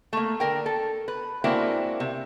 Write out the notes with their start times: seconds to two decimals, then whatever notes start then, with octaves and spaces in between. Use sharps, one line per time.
0.13 A3 A#3
0.40 D3 A#4 G5
0.66 A4
1.08 B4
1.44 G#3 A#3 C4 D4 E4 F#4
2.00 C3